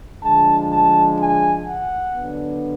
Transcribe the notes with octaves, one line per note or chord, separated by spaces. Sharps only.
D3 F3 G#3 D4 A5
A5
G#5
F#5
D3 F#3 B3 D4